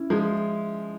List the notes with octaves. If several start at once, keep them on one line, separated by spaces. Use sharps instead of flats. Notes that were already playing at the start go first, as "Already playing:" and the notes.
Already playing: C#4 E4
F3 G#3